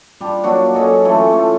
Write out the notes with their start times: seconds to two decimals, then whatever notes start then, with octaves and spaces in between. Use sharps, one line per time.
0.21 G3 D4 F4
0.43 F#3 A#3 D4 F#4
0.74 F#2 C#4 A4 D#5
1.05 E3 A3 F4
1.33 A3 F4